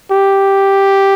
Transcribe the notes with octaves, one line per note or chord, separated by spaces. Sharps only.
G4